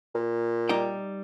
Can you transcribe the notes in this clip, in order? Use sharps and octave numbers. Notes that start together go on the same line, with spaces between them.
A#2
G3 D#4 G5